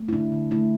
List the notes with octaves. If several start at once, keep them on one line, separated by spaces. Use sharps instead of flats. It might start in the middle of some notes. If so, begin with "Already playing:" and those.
Already playing: A3
E4
D3 D4
D3
A3 E4